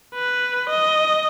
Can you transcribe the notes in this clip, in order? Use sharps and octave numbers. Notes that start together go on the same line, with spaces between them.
B4
D#5